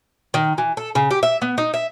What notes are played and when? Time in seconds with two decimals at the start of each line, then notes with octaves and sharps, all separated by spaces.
0.34 D#3
0.58 E3
0.77 A4
0.95 C#3
1.11 G4
1.23 E5
1.42 B3
1.58 D#4
1.74 E5